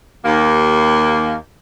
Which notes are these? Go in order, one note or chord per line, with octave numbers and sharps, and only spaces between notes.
D#2 A#3